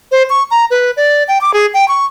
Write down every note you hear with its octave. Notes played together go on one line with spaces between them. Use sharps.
C5
C#6
A#5
B4
D5
G5
D6
G#4
G5
C#6